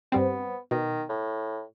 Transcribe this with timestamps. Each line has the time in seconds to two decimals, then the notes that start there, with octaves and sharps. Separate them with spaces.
0.12 G2 G3 B3 C4
0.71 B2 D#3
1.09 A2